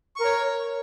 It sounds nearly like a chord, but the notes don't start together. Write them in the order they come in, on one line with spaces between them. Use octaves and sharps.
C#6 A#4 C#5